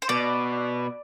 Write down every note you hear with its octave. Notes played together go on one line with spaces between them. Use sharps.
C5
B2 D5